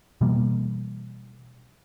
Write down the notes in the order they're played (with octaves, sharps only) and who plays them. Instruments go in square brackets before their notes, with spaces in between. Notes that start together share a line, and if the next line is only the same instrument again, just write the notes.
[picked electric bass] B2 E3 G3 A#3